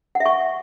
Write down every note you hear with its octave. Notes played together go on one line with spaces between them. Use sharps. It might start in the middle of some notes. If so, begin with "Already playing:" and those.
F#5
E5
C#6